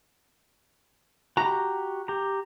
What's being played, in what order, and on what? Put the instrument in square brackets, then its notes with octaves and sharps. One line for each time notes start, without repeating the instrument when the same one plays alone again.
[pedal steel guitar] F#4 G4 [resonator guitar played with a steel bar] A#5
[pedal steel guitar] G4 A#5